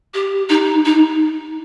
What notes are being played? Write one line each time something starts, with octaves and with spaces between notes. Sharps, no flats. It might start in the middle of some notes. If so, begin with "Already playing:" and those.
G4
D#4
D#4